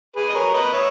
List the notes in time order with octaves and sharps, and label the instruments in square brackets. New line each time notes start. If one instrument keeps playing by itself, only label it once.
[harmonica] G#4 B4
D#5
A#4 C#5
B4 D#5
C#5 E5